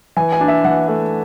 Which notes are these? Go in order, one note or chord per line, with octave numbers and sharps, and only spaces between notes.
E3 G#5
G#5
D4
E5
E3 F#5
A3